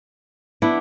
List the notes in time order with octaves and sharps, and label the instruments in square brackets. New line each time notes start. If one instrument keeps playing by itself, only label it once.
[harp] B3 D4 [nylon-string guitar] E4